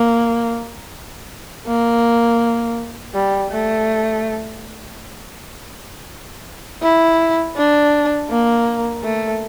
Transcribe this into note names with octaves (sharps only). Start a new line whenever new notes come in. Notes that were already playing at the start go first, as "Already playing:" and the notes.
Already playing: A#3
A#3
G3
A3
E4
D4
A#3
A3